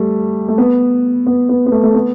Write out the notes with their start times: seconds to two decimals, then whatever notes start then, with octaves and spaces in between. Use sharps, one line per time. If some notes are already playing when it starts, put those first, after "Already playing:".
Already playing: G3 A3
0.48 A3
0.58 B3
1.27 B3
1.49 B3
1.66 B3
1.72 A3
1.83 A3
1.94 B3